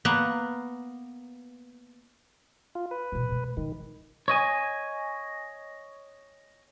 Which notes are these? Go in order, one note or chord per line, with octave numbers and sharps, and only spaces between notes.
A#3 B3 A#4 B4 F#5
F4
B4
B2 E3
B2 G#3
D#3 F3 G#3
C#5 D#5 G#5